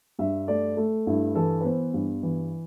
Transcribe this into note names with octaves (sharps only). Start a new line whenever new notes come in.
G2 E5
A3 D5
A3
G2 E4
E3 A4
B4
B3 C5
G2
E3